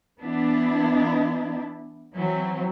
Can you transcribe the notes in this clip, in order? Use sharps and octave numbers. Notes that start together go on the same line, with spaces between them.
E3 B3 D4 E4
E3 F#3 C4